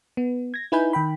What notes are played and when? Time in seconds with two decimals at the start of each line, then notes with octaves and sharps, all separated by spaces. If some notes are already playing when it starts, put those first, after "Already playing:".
0.17 B3
0.54 G#6 A#6
0.72 D#4 E4 B4 G#5 B5 G6
0.93 D#3 G5 B5